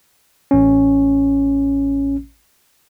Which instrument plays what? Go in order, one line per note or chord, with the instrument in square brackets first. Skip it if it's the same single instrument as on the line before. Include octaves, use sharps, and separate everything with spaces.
[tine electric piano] A1 C#4